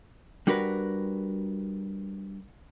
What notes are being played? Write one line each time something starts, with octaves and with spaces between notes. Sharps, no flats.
G3 D4 F#4 A#4 B4